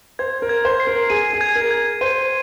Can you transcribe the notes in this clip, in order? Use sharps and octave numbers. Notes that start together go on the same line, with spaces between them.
C5 G#6
A#4
G#6
C5
C7
A#4
G#4 D#7
G#4
G#6
A#4
G#6
C5 D#7